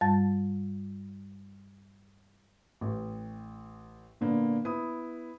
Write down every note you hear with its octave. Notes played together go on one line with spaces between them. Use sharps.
G2 G3 A5 A6
A1
A#2 D3 A#3 B3
B3 E4 D#6